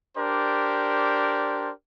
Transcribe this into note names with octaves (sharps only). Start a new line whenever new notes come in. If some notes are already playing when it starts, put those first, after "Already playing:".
D4 G4 A#4 C5 D5